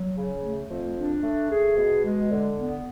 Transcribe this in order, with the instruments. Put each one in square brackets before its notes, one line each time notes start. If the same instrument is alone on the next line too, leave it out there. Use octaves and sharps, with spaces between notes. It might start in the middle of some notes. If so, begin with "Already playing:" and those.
Already playing: [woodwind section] F#3
C#3
A3
F2
D4
A3
G#4
B2
G#3
D3
B3